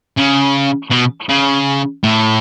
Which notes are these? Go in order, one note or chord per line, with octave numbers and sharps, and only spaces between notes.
C#3
B2
C#3
A2